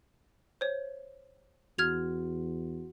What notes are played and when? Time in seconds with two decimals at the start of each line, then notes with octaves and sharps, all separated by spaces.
0.61 C5 C#5
1.78 E2 F#4 F6 G#6 F7